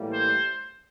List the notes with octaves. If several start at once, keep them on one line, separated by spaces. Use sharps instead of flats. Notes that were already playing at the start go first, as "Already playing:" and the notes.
Already playing: A2 E3 G3 A#3
C5